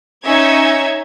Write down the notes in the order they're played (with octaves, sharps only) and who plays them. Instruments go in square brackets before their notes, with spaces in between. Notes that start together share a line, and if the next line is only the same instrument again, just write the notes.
[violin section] C#4 D#4 E5 G#6